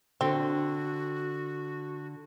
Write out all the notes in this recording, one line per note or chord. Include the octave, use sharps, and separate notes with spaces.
D3 C4 F#4